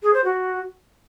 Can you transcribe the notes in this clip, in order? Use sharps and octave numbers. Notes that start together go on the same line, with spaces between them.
G#4
C5
F#4